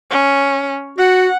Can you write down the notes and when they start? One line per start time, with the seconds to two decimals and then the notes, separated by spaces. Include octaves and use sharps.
0.11 C#4
0.98 F#4 F#5